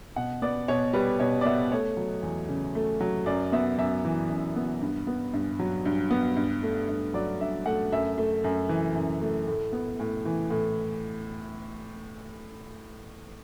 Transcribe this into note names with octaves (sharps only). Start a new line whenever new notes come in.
B2 F#5
B3 D5
B2 C#5
G3 B4
B2 C#5
D5
B3 E5
A3 C#5
F#3
E2
C#3
A3
F#3
F#2 D5
B3 E5
F#2 E5
E3
F#2
B3
G2
B3
G2
F#3
G2
B3
G2
A3
G2
F#3 D5
G2 E5
A3 F#5
F#2 E5
A3
F#2
E3
F#2
A3
A2
B3
A2
E3
A2